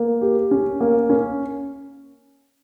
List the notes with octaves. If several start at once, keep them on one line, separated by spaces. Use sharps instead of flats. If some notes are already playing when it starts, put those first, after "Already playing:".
Already playing: A#3
G4
C#4
A#3
C#4